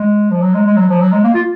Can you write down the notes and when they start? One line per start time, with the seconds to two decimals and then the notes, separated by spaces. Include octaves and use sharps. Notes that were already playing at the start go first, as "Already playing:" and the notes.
Already playing: G#3
0.31 F3
0.42 F#3
0.54 G#3
0.66 G#3
0.76 F#3
0.89 F3
1.00 F#3
1.12 G#3
1.24 A#3
1.34 F4